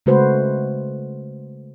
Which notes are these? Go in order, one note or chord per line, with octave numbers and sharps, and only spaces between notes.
C#3 G#3 A3 F#4 B4 C5